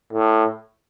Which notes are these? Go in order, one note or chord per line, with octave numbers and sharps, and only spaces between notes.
A2